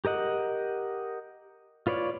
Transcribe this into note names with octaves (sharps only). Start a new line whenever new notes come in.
G4 A#4 D#5 F#5
F4 B4 C#5 D5